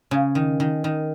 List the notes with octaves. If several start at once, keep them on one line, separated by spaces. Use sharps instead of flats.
C#3
D#3
D#3
D#3